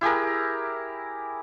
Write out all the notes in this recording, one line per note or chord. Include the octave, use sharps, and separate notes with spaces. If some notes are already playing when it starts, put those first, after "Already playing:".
E4 G4 G#4 A#4